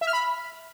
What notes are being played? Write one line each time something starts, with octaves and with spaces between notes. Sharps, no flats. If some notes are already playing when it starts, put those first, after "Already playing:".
E5
F6
B5